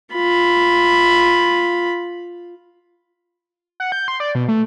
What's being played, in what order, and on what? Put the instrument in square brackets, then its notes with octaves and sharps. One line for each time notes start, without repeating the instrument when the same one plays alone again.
[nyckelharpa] F4 B5
[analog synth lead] F#5
G6
C6
D5
B2
A3